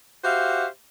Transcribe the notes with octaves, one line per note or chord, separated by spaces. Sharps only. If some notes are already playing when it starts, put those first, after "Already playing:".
F#4 G4 C5 E5 F5